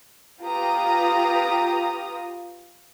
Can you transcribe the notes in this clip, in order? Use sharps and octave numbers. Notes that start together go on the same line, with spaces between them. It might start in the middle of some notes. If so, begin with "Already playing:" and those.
F4 G4 B4 A#5 D#6